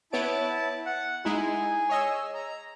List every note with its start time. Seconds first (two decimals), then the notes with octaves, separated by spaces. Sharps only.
0.13 B3 E4 C#5 A5 D7
0.86 F#5
1.25 G#3 D#4 E4 G#4 G#5
1.89 C#5 D#5 E6
2.34 A#5